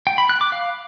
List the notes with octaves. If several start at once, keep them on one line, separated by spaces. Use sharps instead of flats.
G5
B5
F#6
D6
F5